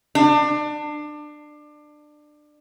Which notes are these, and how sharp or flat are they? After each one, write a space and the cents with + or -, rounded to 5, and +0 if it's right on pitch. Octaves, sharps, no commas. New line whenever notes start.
D4 +25